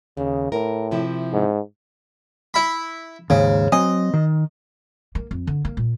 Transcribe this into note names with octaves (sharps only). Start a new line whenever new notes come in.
D#2 C#3
A2 A#4
C3 F3 E4
G#2
E4 B5
D#2 G#2 C#3
F#3 C4 D#5 G#5
D#3
A#3
F2
D3
A#3
A#2